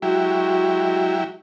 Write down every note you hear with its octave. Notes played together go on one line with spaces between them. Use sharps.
F#3 G#3 E4 F#4 G4